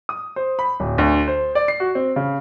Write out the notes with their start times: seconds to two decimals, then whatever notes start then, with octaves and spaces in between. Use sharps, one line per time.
0.09 D#6
0.36 C5
0.59 B5
0.80 D1
0.98 D2
1.28 C5
1.55 D5
1.68 C7
1.80 F#4
1.95 C4
2.16 C#3